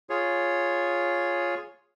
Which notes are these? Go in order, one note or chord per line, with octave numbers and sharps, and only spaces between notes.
F4 G#4 C#5